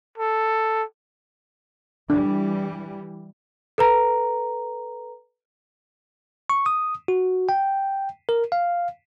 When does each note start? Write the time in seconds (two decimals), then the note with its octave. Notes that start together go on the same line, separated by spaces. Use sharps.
0.18 A4
2.10 E3 G3 D4
3.78 A4 B4 A#5
6.50 C#6
6.66 D#6
7.08 F#4
7.49 G5
8.29 A#4
8.52 F5